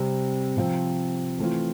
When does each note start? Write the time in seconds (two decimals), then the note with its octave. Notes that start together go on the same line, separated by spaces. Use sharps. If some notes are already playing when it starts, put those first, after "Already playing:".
Already playing: C3 G3 C4
0.57 C3 F3 C4
1.39 E3 A3 C4 F4